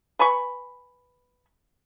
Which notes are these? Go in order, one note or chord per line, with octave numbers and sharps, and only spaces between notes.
B4 G#5 B5 C#6